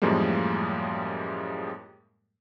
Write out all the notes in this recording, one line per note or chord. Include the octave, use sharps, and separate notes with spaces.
F#2 A2 F3 G3 G#3 A#3